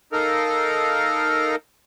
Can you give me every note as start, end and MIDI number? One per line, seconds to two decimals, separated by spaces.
0.12 1.56 63
0.12 1.56 69
0.12 1.56 70
0.12 1.56 77